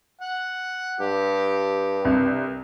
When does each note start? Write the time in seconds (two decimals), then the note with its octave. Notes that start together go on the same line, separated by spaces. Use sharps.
0.21 F#5
1.00 G2 G4
2.05 C2